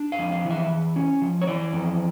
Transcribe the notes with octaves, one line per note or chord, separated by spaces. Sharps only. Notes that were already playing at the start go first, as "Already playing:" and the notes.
Already playing: D4
F5
F2
F5
E3
E5
E2
C#4
F3
C#5
E3 D5
F2